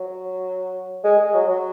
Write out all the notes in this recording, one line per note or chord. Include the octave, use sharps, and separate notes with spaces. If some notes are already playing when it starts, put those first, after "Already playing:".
Already playing: F#3
G#3
G#3
F#3
F#3